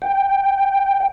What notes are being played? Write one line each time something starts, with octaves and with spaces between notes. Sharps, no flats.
G5